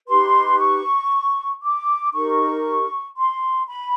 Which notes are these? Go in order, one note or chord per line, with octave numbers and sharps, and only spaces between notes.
D#4 G4 B4 C6
C#6
D6
D#4 G4 A#4 C#6
C6
B5